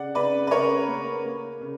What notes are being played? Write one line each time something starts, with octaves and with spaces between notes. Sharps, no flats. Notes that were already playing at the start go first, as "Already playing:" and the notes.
Already playing: C#3 D5 F#5
C#3 B4 D5
B4
C#3 A#4 C#5
A#3
A#3
C#3